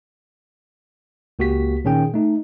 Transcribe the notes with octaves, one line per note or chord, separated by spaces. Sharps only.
C#2 A#3 F#4 G4 B6
A#2 D#3 C#4 G#4 G5
A3 D#4